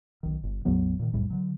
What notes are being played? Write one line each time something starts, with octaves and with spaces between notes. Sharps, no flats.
B1 D#3
G1
A1 E2 F#3 B3
A#2 D#3
C2 F2 A2 G3
D3 F#3